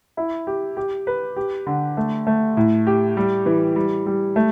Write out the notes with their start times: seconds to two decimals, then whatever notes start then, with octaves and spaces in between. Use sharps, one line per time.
0.17 E4
0.47 G4
0.77 G4
1.07 B4
1.36 G4
1.67 D3
1.97 A3
2.27 A3
2.57 A2
2.87 G4
3.17 G3
3.46 E3
3.76 G3
4.06 G3
4.36 A3